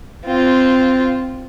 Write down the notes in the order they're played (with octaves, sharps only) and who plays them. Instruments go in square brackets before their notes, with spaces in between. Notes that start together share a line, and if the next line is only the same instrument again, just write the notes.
[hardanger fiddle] C4 F4